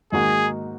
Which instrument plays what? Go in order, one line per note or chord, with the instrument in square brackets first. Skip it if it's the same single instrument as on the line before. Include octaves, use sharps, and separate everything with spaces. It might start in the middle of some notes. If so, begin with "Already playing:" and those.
[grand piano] G#2 D#3 A#3 D#4 F#4 [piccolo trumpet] G#4